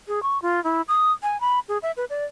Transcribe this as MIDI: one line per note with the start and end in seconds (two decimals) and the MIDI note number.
0.08 0.22 68
0.23 0.41 85
0.42 0.63 65
0.64 0.82 64
0.88 1.12 87
1.23 1.40 80
1.41 1.59 83
1.69 1.78 68
1.83 1.92 76
1.97 2.05 71
2.10 2.25 74